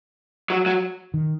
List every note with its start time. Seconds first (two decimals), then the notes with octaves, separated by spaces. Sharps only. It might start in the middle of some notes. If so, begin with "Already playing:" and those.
0.50 F#3
0.66 F#3
1.14 D#3